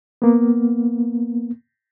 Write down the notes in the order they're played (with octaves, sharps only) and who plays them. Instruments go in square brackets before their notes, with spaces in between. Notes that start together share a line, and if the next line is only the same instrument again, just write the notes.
[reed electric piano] A#3 B3